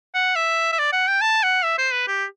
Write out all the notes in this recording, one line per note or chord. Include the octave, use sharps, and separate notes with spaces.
F#5
E5
E5
D5
F#5
G5
A5
F#5
E5
C5
B4
G4